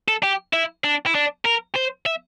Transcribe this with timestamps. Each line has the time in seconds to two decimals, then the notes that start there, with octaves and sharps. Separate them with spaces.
0.08 A4
0.23 G4
0.53 E4
0.84 D4
1.06 E4
1.15 D4
1.45 A#4
1.75 C5
2.06 E5